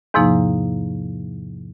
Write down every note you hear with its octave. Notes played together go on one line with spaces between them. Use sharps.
E2 G#2 C3 F3 A#3 D#4